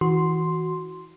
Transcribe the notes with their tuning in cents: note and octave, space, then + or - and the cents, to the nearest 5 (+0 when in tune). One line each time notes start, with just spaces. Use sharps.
E3 -30 F#4 +0 C6 +0